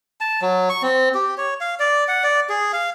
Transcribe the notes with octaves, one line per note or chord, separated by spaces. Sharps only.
A5
F#3
C#6
C4
G4
C#5
F5
D5
F#5
D5
G#4
F5